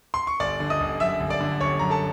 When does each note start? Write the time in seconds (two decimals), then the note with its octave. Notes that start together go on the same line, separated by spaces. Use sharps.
0.14 C6
0.27 C#6
0.40 G1 D5 D6
0.60 D3
0.70 D#5 D#6
0.80 G1
1.00 F#2 E5 E6
1.20 G1
1.30 D5 D6
1.41 D3
1.60 G1 C#5 C#6
1.79 F#2 A#5
1.90 A4 A5